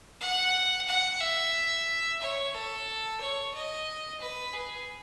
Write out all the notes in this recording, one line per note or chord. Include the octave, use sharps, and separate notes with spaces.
F#5
F#5
E5
C#5
A4
C#5
D#5
B4
G#4